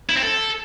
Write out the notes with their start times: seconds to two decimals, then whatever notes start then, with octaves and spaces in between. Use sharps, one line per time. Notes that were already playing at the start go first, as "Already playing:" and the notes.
0.10 E4
0.16 C4
0.22 A4